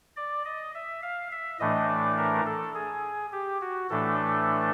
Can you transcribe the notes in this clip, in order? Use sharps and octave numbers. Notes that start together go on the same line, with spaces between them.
D5
D#5
E5
F5
E5
A2 E3 A3 D4 D#5
D5
A#4
A4
G#4
G4
F#4
A2 E3 A3 D4 A4